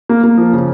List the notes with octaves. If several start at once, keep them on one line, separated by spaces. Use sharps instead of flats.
A#3
A#3
F3
C#3